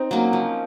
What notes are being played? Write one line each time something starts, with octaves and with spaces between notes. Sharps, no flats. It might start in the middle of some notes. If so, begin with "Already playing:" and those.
Already playing: C4 D#4
F#3 A#3 C#4
F3